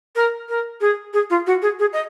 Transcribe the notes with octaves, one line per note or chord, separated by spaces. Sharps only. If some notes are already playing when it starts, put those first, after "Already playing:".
A#4
A#4
G#4
G#4
F4
F#4
G#4
G#4
D#5